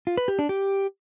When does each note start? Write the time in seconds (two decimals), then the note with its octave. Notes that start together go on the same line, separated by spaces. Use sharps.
0.07 F4
0.17 B4
0.28 G4
0.39 D4
0.49 G4